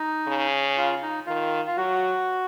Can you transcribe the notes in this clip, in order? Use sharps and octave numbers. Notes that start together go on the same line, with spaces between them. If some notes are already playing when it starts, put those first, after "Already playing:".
Already playing: D#4
C#3
F4
D#4
D#3 F4
F4
F#3 F#4